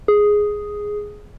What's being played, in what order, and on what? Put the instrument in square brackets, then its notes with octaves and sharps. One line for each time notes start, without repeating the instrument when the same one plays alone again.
[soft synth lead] G#4